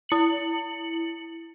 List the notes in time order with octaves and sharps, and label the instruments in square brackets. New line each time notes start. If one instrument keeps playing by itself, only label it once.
[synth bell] E4 C#7 F#7